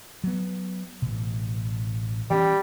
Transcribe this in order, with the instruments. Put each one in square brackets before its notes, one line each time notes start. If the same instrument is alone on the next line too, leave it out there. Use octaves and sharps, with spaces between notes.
[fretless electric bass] F#3 B3
A1 B2
[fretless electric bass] E3 C4 C#4 [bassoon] G3